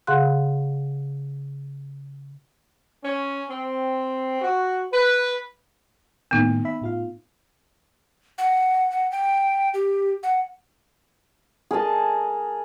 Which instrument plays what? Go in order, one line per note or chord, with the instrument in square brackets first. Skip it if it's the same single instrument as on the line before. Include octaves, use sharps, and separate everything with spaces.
[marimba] C#3 G#4 F5 F#5 C6 F#6
[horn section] C#4
C4
F#4
B4
[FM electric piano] A2 D#3 A#3 [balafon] B3 D#4
[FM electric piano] E5 B5
A2 F4 F5
[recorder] F#5
F#5
G5
G4
F#5
[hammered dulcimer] G#4 A#4 D#5 A5